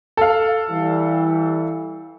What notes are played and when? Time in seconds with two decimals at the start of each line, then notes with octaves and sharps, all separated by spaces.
0.17 A4 F5
0.70 E3 G3